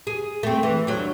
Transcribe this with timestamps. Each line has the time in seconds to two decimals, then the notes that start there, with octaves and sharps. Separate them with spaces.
0.07 G#4
0.43 A3 C4
0.63 E3
0.87 D2 F#3